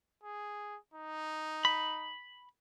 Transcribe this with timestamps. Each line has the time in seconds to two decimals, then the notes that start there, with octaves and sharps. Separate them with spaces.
0.23 G#4
0.94 D#4
1.65 B5